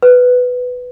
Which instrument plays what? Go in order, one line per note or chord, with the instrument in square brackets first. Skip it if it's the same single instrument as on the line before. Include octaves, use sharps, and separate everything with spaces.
[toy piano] B4